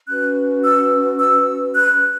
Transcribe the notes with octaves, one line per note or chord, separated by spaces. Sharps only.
C#4 F#4 B4 F#6
E6
E6
F#6